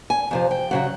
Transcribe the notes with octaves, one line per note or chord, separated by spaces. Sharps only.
G#5
F2 C3 F3
G5
F#2 C#3 F#3 F#5